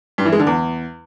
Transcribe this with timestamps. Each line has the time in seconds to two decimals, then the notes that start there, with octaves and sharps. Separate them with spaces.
0.18 G2
0.25 E3
0.32 G#3
0.40 D3
0.47 E2